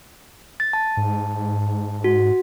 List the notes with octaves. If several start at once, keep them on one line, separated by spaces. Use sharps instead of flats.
A6
A5
G#2
F#4